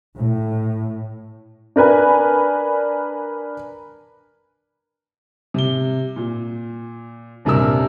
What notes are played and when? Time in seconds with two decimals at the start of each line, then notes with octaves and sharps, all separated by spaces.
0.17 A2
1.76 D4 A#4 B4 G#5
5.54 C3 G7
6.16 A#2
7.45 D#1 G2 C3 G3 A#4 E6